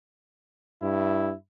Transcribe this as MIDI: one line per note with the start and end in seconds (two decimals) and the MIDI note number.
0.82 1.33 43
0.82 1.35 64